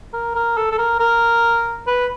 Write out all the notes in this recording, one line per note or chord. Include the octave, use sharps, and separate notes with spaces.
A#4
A#4
A4
A4
A#4
A#4
B4